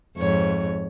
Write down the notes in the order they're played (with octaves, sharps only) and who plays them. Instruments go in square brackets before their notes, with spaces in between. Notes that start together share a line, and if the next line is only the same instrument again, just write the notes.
[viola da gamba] F2 G#2 C#5